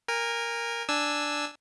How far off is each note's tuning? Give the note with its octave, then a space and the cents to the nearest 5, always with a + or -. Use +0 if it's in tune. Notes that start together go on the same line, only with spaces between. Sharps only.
A#4 +0 G#5 -30
D4 +0 G#5 +0 E6 +0